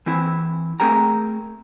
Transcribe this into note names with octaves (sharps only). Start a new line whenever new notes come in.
E3 C4 E4
A3 C4 G#4 A#4 G5 A#5